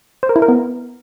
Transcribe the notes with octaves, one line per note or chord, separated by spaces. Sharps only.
C5
A#4
E4
A#4
B3